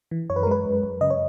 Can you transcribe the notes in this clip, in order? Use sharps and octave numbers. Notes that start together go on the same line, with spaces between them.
E3
F#2 C#5
B4
A#4
G#3 B4
F#2
F#2
C#3 D#5
C#5